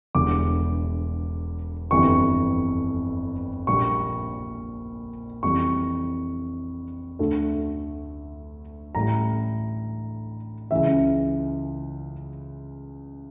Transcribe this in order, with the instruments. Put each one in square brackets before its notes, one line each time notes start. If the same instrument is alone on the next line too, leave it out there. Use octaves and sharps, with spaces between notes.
[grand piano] E1 E2 D3 G3 D6
G1 F2 E3 G3 C#6
A#1 A#2 G3 C#6
F2 E3 G3 C#6
D2 D3 A3
A1 A2 G3 A#5
C#2 C#3 E3 E5